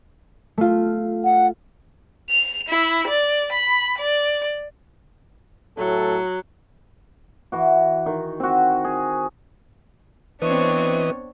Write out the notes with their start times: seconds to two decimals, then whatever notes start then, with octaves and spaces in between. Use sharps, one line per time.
0.58 A3 F4
1.24 F#5
2.30 F7
2.69 E4
3.08 D5
3.52 B5
3.98 D5
5.78 A2 F#3 A4
7.52 E3 F#4
8.06 D#3
8.40 C4 F#4
8.84 G#4
10.42 E3 B3 C4 D4 B4 C#5 D#5 C#6